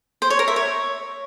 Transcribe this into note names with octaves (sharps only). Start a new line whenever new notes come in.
C5
C#5
A#4
E5
C#5